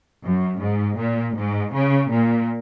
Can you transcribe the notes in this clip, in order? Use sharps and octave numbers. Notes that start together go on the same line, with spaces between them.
F#2
G#2
A#2
G#2
C#3
A#2